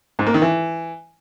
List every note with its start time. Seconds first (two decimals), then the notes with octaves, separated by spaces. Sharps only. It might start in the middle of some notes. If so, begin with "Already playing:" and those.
0.19 G#2
0.27 A#3
0.34 D#3
0.42 E3